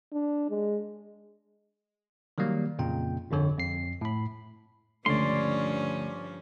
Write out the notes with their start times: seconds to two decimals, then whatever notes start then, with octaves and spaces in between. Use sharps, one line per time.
0.13 D4
0.50 G#3
2.38 D#3 F#3 G3 A#3
2.79 F2 A#2 C#3 G5
3.31 G1 F2 D3 C#5
3.57 F2 C7
4.01 A2 B5
5.06 C#2 G2 D3 F3 A3 C#4 D5 C6